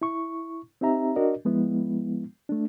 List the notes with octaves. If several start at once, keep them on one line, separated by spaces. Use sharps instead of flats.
E4 C#6
C4 D#4 G4 E5 A#5
D4 F#4 A#4 D5 D#5
F3 G#3 B3 E4
A3 D4